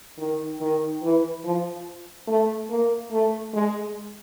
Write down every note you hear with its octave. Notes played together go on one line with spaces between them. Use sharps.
D#3
D#3
E3
F3
A3
A#3
A3
G#3